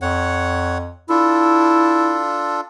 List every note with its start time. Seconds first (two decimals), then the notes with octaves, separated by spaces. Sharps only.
0.02 F2 C#5 F#5
1.09 D4 E4 F4 A4